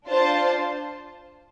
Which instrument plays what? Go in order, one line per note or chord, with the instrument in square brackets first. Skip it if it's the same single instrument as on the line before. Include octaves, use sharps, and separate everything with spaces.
[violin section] D4 F4 C5 A5